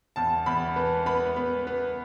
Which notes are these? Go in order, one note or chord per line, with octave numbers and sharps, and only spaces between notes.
E2 A5
E2 B5
B3
B3 B5
B3
B3